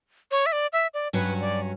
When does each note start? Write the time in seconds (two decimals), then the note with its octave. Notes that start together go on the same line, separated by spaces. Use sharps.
0.31 C#5
0.46 E5
0.52 D5
0.73 E5
0.94 D5
1.13 G2 F#3 C#4 F#4 B4
1.41 D5